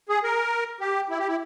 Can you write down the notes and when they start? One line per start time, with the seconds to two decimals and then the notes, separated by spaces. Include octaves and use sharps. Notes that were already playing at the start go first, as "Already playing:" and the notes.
0.09 G#4
0.23 A#4
0.80 G4
1.10 E4
1.19 G4
1.28 E4